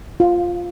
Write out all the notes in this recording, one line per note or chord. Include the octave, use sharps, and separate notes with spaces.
F4